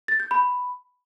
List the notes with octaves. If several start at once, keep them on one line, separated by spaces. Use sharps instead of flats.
A6
G6
B5